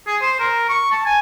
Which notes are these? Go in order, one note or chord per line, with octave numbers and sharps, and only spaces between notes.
G#4
C5
A#4
C#6
A5
G#5